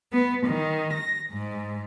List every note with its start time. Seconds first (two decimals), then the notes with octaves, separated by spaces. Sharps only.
0.13 B3
0.44 D#3
0.93 A#6
1.31 G#2